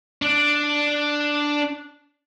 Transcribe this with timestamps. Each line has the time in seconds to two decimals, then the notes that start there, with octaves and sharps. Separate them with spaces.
0.22 D4 D5